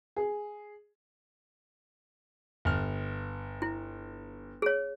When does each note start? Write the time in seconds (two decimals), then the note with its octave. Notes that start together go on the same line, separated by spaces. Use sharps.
0.17 G#4
2.65 G1 F6
3.62 E4
4.62 G#4 C#5